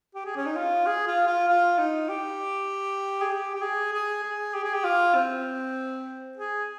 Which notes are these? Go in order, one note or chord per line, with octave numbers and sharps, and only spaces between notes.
G4
G#4
C#4
D#4
F4
G#4
F4
F4
F4
D#4
G4
G#4
G4
G4
G#4
G#4
G#4
G4
G#4
G4
F4
C4
G#4